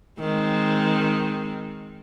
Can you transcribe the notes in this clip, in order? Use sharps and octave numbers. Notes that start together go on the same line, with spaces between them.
D#3 G#3 C4